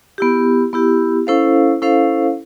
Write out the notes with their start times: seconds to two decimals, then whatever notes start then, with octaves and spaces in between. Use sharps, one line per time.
0.18 B3 E4 G4
0.73 B3 E4 G4
1.27 C#4 E4 A4 C5 F5
1.82 C#4 E4 A4 C5 F5